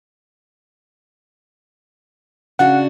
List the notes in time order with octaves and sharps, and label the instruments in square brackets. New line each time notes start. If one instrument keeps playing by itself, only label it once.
[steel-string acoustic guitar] C#3 D4 F#4 [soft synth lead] F#5